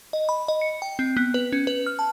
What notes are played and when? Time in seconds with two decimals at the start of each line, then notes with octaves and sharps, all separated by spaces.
0.13 D#5
0.29 B5
0.48 D#5
0.61 C#7
0.82 G5
0.99 C4
1.17 B3
1.34 B4
1.52 C#4
1.67 B4
1.86 F6
1.99 A5